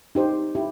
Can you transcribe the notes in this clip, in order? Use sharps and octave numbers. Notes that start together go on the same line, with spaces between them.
D#4 G4 C5
E4 G4